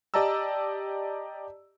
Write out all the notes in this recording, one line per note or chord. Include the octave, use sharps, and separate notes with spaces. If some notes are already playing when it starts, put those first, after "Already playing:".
G4 D5 D#5 A5 A#5 E6